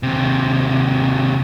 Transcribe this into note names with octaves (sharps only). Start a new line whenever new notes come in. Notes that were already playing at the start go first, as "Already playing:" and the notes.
D#2 C3